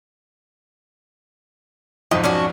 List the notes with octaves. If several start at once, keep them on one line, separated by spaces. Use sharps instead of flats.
B1 F2 G#2 D#4
C#4 D4 F#4